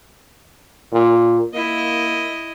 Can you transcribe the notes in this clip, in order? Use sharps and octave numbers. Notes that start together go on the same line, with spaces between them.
A#2
A#3 E4 D#5